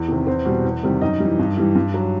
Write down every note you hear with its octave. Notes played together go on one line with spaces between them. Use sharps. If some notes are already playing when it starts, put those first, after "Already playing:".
Already playing: E2
C3 D#3
E2 C4 C5
B2 G3
E2
C3 D#3 G3
F#2 D#4 D#5
E3 G3
G2
E3 G3
G2
F#3